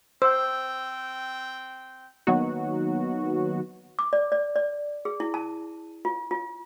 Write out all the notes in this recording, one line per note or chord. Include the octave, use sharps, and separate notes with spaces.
C4 C5 G5 E6
D#3 F#3 A#3 B3 D#4 F#4
D6
D5
D5
D5
G#4
E4
A5
F4
F4